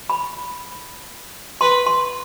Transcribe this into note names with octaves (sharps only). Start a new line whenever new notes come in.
B5
B4 C6
C6